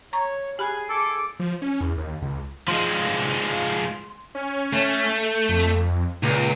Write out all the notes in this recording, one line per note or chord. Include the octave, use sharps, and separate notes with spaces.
C#5 A#5 C#6
G4 G#4 G#5 B5 F#6
A4 D6
F3
C#4
E2
D#2
C#2
F3 G#3 C6
C#4
A3
F2
C#2 A#2